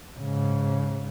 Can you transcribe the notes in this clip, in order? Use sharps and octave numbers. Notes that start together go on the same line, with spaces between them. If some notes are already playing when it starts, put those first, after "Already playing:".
G#2 C#3